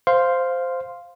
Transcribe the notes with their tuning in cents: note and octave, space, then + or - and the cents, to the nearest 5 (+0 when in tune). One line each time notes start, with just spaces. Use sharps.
C5 -5 F5 +0 C6 +0